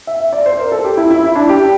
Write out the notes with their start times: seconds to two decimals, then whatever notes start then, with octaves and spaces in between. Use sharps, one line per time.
0.07 E5
0.20 E5
0.33 D5
0.46 C5
0.59 A#4
0.72 A4
0.84 G4
0.97 E4
1.10 E4
1.23 E4
1.35 D4
1.49 G4